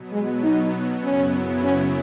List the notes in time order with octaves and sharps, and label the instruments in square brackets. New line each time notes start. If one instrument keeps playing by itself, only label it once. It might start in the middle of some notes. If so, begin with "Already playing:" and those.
Already playing: [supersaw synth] B2 F#3 B3
[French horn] G#3
D#4
[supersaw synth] F#2 C#3 F#3 B3 E4 [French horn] C#4
[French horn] C#4